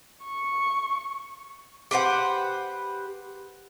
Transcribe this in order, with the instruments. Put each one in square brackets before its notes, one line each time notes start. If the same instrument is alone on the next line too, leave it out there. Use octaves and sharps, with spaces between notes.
[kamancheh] C#6
[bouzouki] G4 B4 C5 F#5